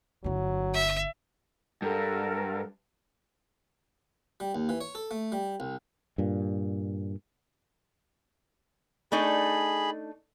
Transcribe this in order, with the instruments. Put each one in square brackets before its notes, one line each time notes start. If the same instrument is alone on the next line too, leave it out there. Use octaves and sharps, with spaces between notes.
[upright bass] G1 E4 [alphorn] F#3
[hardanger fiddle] E5
[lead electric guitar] G2 [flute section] A4 A#4 F#5
[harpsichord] G3
D#2
E3
C#5
A4
A3
G3
C2
[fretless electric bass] G2 A#2
[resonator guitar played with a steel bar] A3 D4 D#4 [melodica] G#4 B5